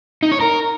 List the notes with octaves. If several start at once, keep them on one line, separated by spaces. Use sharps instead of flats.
D#4
C#5
A#4